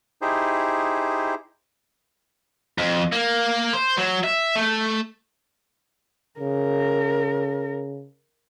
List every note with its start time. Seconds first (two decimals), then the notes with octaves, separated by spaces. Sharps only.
0.22 D#4 E4 G4 G#4 C5
2.78 F2
3.12 A#3
3.74 C5
3.98 F#3
4.24 E5
4.55 A3
6.40 C#3 A#4